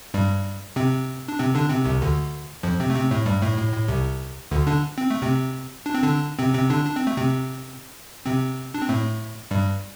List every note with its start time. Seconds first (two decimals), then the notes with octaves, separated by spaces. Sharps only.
0.14 G2 G3
0.76 C3 C4
1.28 D4
1.39 C3 C4
1.55 D3 D4
1.70 C3 C4
1.85 C2 C3
2.02 D2 D3
2.63 F2 F3
2.80 C3 C4
2.90 A3
2.95 C3 C4
3.11 A2 A3
3.26 G2 G3
3.43 A2 A3
3.58 A2
3.73 A2
3.88 C2 C3
4.51 D2 D3
4.67 D3 D4
4.98 C4
5.10 A3
5.22 C3 C4
5.86 D4
5.94 C4
6.03 D3 D4
6.39 C3 C4
6.54 C3 C4
6.70 D3 D4
6.86 D4
6.96 C4
7.07 A3
7.17 C3 C4
8.26 C3 C4
8.74 D4
8.81 C4
8.89 A2 A3
9.51 G2 G3